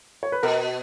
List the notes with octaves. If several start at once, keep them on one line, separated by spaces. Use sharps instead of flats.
C#5
B4
B2 A#4